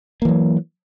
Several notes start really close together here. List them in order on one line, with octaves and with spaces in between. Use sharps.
A#3 E3 F#3